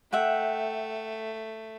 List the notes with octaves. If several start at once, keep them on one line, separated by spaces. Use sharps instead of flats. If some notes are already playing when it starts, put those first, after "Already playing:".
A3 E5 F#5 G5